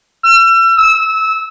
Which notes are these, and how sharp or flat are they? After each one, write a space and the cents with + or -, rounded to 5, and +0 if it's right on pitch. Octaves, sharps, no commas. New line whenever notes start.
E6 +40
E6 -20